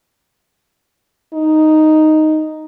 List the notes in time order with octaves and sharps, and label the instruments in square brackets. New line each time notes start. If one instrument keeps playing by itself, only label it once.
[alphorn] D#4